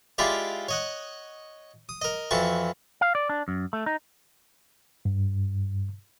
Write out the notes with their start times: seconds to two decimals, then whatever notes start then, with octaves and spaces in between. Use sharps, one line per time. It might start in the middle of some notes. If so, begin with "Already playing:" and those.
0.18 G#3 E4 F4 G4 D5 F5
0.69 C#5 D#5 F#5
1.89 D#6
2.01 A#4 D#5
2.31 F2 E3 F#4 A5 C#6
3.01 F5
3.15 D5
3.29 D4
3.48 F#2
3.73 A3
3.86 D#4
5.05 G2